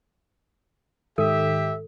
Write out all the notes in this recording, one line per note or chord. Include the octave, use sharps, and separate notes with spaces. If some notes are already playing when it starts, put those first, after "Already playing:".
G#2 D#3 G4 A4 E5